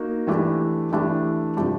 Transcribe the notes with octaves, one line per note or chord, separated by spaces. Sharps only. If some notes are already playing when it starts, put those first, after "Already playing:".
Already playing: A#3 D#4 F#4
E3 A3 D4 G4
E3 A3 D4 G4
C3 F3 A3 D4 G4